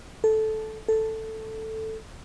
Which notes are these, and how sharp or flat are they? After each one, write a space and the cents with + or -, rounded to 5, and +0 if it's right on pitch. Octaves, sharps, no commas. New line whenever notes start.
A4 -10
A4 +5